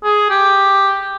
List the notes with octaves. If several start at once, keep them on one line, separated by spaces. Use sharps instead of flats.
G#4
G4